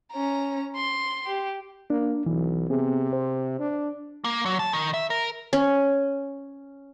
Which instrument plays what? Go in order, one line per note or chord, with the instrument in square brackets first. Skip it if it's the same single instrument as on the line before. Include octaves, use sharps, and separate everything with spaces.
[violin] C#4 A#5
C6
G4
[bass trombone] A#3 [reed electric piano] D4
[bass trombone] B1 [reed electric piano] E3
[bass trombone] C3 [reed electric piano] B3 C4 G#4
[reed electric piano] C5
[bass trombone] D4
[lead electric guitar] A#3
F#3
A5
D#3
E5
A#4
[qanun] C#4